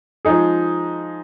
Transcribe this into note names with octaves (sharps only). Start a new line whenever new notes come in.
F3 G#3 D#4 G#4